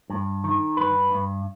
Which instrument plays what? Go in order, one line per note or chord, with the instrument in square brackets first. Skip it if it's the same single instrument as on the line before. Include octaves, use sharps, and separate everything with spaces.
[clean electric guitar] G2
D#3
G2 B4
G2